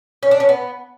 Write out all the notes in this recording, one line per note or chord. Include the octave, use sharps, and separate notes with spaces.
C#4
D4
C#4
B3